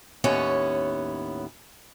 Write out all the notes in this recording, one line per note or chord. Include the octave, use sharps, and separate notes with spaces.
D#2 A2 B3 C#4 C#5